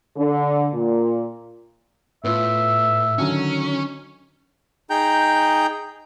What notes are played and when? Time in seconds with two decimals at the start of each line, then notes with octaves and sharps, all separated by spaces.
0.17 D3
0.74 A#2
2.24 A2 B3 F4 E5
3.18 D3 D#3 F#3 C#4
4.90 D#4 G#4 G5 A#5 G6